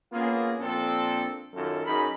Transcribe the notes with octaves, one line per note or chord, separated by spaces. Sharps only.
A#3 B3 C#4 F4 G#4
A#2 F3 C4 D4 A4
F#2 D#3 F4 A4
F#2 D#4 G#4 A#4 B5